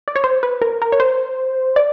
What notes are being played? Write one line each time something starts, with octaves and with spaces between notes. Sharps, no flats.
D5
C#5
C5
B4
A#4
A#4
C#5
C5
D5